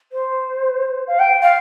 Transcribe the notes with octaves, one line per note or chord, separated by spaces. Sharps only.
C5
F5
G5
F5